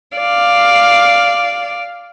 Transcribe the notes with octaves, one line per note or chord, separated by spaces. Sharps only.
D5 F5